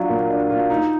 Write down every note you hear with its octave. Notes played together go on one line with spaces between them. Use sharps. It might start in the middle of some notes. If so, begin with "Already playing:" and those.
Already playing: F#3 D4 F4
A#2
D4
F4
D#4